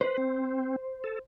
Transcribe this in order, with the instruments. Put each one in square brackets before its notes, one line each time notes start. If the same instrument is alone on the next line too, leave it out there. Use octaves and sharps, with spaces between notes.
[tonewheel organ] B4 [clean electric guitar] C5
[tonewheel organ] C4
A4